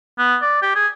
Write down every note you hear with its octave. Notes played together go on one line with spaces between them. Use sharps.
B3
D5
G4
G#4